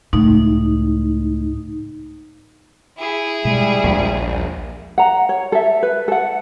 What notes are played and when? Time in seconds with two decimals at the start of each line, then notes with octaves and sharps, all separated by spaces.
0.13 C#2 A2 D#4
2.98 E4 G#4
3.45 B2 G3 G#3
3.84 A#1 D#2 F3 G#3
4.98 F#5 A#5
5.29 C#5
5.52 A4 E5
5.83 B4
6.08 A4 F#5